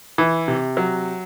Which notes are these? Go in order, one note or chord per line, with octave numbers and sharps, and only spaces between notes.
E3
C3
F#3